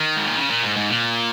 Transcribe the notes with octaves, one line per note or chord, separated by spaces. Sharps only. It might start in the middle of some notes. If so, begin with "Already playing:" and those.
Already playing: D#3
G#2
A#2
C#3
A#2
G#2
G#2
A#2